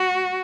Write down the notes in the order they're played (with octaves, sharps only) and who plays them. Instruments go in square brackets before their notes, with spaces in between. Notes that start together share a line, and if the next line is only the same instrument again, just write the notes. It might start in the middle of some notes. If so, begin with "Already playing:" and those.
Already playing: [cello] F#4